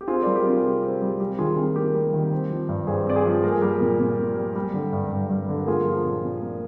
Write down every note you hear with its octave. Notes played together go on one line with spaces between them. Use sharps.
G4
C4 F4 G#4
G3 A#4 D5
G4
C3 F4
G#4
C3 G4
C4
G3
G3 G4
D#3 F4 G#4
C3 F4 G#4
A#3 G4 A#4
G3
D#3
C4
F3
G2
G2 G#4 C5
C4 D5
G#4 C5
F3
A#3 A#4
G#4
G3 G4 A#4
A#2
A#2
A#3
G3
G3
D3
G2
G2
G3
D3
A#4
A#3 F4 G#4
F3
A#2
A#2
A#3